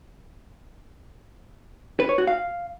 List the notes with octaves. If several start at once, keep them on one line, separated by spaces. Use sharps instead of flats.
B4
C#5
F#4
F5